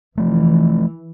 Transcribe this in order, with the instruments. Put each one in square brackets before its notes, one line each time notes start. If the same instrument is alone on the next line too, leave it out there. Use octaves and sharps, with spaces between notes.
[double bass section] E3 [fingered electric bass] F3 A3